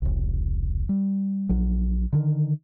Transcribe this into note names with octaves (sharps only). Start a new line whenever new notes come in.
E1 C2
G3
A#1 F#3
D3 D#3